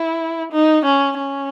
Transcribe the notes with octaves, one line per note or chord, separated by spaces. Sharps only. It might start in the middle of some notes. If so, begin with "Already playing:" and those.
Already playing: E4
D#4
C#4
C#4